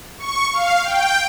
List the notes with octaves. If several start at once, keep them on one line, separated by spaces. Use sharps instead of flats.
C#6
F5
G5